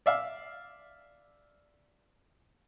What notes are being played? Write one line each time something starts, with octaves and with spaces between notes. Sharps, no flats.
D5 E5 F5